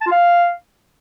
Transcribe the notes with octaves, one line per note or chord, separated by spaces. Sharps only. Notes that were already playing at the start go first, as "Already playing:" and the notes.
A5
F4
F5